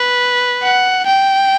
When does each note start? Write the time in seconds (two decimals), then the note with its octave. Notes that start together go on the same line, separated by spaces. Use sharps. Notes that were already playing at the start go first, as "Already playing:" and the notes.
Already playing: B4
0.63 F#5
1.06 G5